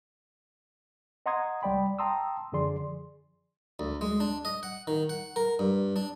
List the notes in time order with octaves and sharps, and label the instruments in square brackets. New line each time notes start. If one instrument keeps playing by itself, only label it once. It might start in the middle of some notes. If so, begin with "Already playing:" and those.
[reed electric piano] D#5 F#5 A#5 C6 D#6 G#6
C2 G3 D5 G5 B5
G5 A5 A#5 C6 D#6 E6
F#2 D3 F3 G#4 D5 C6
[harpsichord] D2
G#3
D4
D#5
F#5
D#3
F#5
A#4
G2
D4